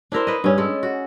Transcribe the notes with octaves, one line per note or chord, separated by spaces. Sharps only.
D4 E4 A#4 C5
B4 D#5
G2 C#4
G#3 A4
F#4